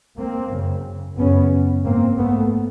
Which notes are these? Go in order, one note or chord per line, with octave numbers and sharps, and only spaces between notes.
A#3 C4
F#2 C#3
F#2 C#3 B3 C#4
G#2 A#3 C4
A3 B3